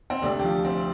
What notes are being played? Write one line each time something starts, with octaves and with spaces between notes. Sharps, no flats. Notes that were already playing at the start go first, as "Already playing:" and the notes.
C4
D2 C3 A3 D4
G4
F3 F4
C4